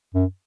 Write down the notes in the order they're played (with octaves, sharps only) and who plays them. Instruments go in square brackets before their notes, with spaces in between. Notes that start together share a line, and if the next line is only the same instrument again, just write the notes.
[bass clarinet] F#2